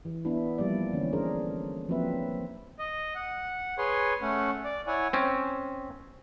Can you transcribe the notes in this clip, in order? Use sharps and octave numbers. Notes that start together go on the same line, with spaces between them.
E3
B3 D4 E4
F3 G3 A#3 D5
D3 E3 C#4
D4 G#4 A#4 C5
F3 F#3 A#3 C4 B4 E5
D#5
F#5
G#4 B4 C#5 C6
A3 C#4 F#5
D5
E4 C#5 F#5 G#5
C4 C#4